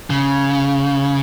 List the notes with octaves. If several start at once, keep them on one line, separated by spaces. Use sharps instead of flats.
C#3